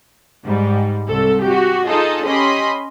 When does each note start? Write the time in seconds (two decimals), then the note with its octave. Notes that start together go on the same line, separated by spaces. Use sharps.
0.44 G#2 G3
1.08 C2 A4
1.44 F#4 G4
1.86 D#4 F4 G#4 A4 D#5
2.25 C#4 G4 D#5 B5 C6